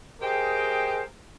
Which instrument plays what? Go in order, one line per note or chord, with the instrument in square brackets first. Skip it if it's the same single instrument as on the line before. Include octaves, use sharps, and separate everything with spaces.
[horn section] G4 G#4 A#4 C5 D#5 G5